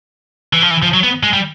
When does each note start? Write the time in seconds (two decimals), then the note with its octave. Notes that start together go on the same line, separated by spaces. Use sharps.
0.53 E3
0.62 F3
0.71 E3
0.83 F3
0.94 F#3
1.03 B3
1.23 G#3
1.33 G3